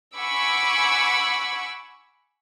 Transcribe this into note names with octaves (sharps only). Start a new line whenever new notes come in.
F#5 G#5 B5 C#6 D6 E6